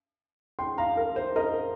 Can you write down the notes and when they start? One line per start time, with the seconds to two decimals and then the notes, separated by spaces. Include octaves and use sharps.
0.59 G5 C6
0.78 F5 A#5
0.97 A#4
1.16 C5
1.36 A#4 D#5